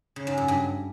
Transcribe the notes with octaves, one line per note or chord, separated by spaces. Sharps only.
C#3
G#2
F#2
G2